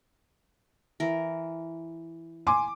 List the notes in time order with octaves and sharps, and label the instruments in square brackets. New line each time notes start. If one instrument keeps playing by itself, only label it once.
[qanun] E3 A#4
[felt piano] G#5 C6 D6